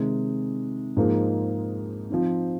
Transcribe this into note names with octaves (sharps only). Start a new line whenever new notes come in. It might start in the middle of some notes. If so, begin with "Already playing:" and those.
Already playing: C3 D#3 G#3
G#2 F3 A#3 D#4 G#4
F3 C4 D#4